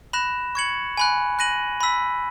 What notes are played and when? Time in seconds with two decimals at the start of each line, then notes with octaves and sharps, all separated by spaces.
0.13 B5 F#6 A#6 E7
0.55 C#6 G#6 C#7 F#7
0.97 G#5 B5 F#6
1.39 F#6 A#6 D#7 F#7
1.81 B5 E6 B6